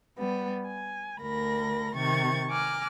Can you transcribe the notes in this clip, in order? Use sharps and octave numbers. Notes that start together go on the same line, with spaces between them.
G3 B3
G#5
D2 A#4 B5 A#6
C3 D#3 C#6 G#6 A6
G#5 A#5 D6 F6 F#6